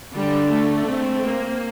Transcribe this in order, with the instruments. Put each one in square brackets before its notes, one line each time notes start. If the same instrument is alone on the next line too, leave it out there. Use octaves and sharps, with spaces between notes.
[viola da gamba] D3 [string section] G3
[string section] A3
[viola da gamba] C4
[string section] A#3